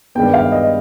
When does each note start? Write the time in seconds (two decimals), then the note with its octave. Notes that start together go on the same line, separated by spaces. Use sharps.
0.15 G2 D#3 G#3 B3 G5
0.34 F5
0.52 D#5